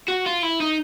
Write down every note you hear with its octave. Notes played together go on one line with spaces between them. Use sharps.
F#4
F4
E4
D#4